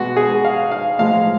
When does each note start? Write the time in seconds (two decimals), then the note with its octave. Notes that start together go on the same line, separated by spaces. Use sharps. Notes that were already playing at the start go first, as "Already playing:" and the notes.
Already playing: B2 G#3 F#4
0.17 G#4
0.44 F5
0.71 F5
0.99 A2 F3 G#3 F5